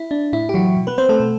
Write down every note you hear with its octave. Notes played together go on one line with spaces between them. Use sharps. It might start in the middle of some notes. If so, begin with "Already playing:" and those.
Already playing: E4
D4
A2 E4
G4
E3 F#3 F#4
B2
B3 B4
C4 C5
A3 A4
B2